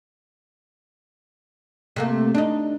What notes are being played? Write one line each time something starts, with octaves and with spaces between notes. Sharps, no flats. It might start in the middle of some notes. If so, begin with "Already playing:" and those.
C3 A3 A#3
D4 D#4